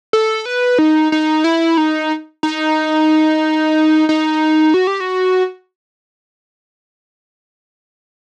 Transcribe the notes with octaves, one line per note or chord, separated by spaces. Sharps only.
A4
B4
D#4
D#4
E4
D#4
D#4
D#4
F#4
G4
F#4